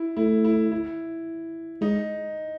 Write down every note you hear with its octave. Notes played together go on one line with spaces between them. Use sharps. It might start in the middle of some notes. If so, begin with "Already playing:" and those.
Already playing: E4
A3 E4
E4
E4
G#3 D#4